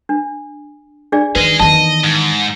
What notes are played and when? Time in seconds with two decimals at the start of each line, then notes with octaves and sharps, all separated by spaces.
0.09 D4
1.12 D4 G#4 D5
1.35 D#3 G#4 B4 D#5
1.60 E2 D#3 D#5 A5
2.04 G#2